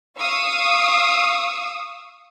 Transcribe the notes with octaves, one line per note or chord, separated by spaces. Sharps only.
F5 C#6 D#6 E6